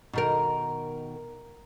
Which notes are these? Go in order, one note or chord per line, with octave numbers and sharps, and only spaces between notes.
B2 D#3 A#4